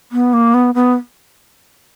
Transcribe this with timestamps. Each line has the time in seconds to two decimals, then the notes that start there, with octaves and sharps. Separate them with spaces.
0.12 B3
0.33 A#3
0.54 B3
0.74 B3